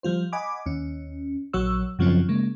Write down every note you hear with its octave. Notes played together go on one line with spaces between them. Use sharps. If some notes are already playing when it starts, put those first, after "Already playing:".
F3 G3 F4 C5
D#5 F#5 G#5 B5 D6
D#2 C#4
A#1 F#3 F#4 C#5 C#6 E6
F#2 C#3 F3 F#3 C4 C#4
C#3 G#3 A#3